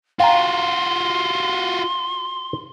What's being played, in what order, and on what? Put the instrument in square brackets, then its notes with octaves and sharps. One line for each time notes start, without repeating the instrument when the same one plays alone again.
[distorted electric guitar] F4 F#4 [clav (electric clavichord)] F5 G5 A#5 [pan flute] C6